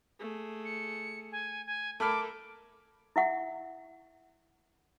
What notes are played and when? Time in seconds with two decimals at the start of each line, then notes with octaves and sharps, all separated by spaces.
0.19 A3 G#4
0.65 C#7
1.32 G#5
1.66 G#5
2.00 A3 A4 A#4 B5 D6 F6
3.16 E4 E5 F#5